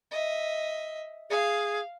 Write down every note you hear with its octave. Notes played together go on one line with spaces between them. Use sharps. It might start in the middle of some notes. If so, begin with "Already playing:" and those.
D#5 E5
G#4 F5